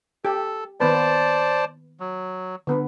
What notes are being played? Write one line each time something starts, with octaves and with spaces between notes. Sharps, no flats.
G4 A4
D#3 B3 B4 C5 D5 A5
F#3
D3 B3 B4